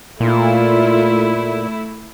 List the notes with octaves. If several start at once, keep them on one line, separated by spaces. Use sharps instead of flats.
A#2 A3 E4 F4